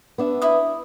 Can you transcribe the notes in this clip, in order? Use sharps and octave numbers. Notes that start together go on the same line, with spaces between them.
B3 D4 E5
E4 D#6